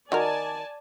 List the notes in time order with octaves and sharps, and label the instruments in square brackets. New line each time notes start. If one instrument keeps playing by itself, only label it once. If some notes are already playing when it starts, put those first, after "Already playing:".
[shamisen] D#3 F#4 A#4 [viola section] D5 G#5 A5